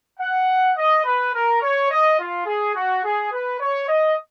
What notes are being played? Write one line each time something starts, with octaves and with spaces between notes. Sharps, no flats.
F#5
D#5
B4
A#4
C#5
D#5
F4
G#4
F#4
G#4
B4
C#5
D#5